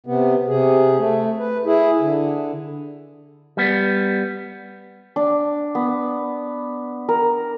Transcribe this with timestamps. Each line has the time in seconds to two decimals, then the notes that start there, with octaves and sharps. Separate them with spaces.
0.06 C3 B3
0.48 C3 G#4
0.98 A3
1.39 B4
1.66 E4 G#4
2.01 D3
3.57 G3 B3
5.16 D4
5.75 B3
7.09 A#4